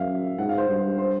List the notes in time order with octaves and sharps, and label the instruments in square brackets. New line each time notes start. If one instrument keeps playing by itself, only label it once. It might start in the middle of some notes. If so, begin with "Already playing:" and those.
Already playing: [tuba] F#2 [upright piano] E5 F5
[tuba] G#2 [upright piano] F#5
[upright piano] F5
C5
[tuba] G2
[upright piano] C5